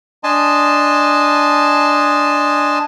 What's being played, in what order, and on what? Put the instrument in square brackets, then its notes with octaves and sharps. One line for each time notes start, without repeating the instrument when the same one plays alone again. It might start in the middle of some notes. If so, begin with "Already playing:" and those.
[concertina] D4 D#5 G#5 A5 C6